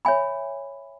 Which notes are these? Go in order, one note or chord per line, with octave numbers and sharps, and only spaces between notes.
C#5 E5 G#5 B5